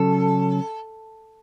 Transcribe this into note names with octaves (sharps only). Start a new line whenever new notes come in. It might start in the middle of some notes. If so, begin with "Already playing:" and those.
Already playing: C#3 F#3 C#4 A4